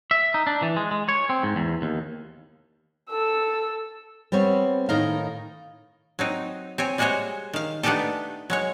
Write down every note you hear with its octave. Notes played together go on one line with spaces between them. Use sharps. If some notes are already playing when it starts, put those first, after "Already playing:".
E5
D#4
D4
E3
G#3
G#3
C#5
C4
G#2
E2
D#2
A4 E6
G3 B3 C4 C#5
A2 D#3 D#4 A#4 F5
F#3 C4 D#4
C4 C#5 G#5
G3 G#3 F#4 G#4 C5 C#5
D#3 F5
A3 B3 D4 D#4 G4 A4
F#3 G#3 C#5